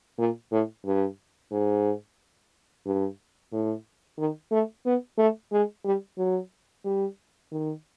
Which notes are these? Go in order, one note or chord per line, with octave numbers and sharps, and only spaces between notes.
A#2
A2
G2
G#2
G2
A2
D#3
A3
B3
A3
G#3
G3
F#3
G3
D#3